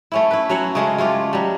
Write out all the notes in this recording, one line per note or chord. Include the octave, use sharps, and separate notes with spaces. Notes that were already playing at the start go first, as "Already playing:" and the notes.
A3 C#4 E4
E4 B4
F#3 C#4 F#4 F#5
C#3 G#3 A3
G#3 A3 F4 G4
F#3 G3